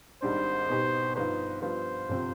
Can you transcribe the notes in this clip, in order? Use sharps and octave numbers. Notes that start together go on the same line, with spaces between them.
G#1 G#2 G3 D4 C5
B2 B3 D#4 G4
G2 F3 B3 D#4 B4 C5
G2 F3 B3 C5
G1 C3 F3 C4